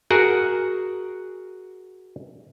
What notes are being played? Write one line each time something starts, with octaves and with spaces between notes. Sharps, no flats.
F#4 G#4 A#4 F#5